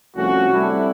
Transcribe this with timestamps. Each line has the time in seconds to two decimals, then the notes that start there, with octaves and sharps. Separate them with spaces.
0.17 C2 F3 A3 C#4 F#4
0.54 G3 A3 C4 D4 E4